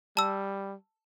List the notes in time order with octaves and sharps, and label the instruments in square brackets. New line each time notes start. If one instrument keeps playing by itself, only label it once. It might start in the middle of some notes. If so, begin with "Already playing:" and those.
[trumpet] G3 [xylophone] A5 E6